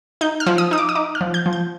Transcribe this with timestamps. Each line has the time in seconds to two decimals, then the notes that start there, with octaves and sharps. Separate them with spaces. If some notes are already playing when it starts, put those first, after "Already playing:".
0.21 D#4 G6
0.40 F6
0.46 F3
0.58 D#6
0.71 D#4 D#6
0.78 D6
0.89 D#6
0.95 D#4 D6
1.15 F6
1.21 F3
1.34 G6
1.46 F3
1.53 G6